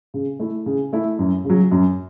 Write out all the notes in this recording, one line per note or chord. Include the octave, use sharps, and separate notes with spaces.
C#3
A3 E4
C#3
A3 E4
F#2
C#3
F#3
F#2